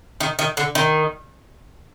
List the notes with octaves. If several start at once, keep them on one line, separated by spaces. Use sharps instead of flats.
D#3
D#3
D3
D#3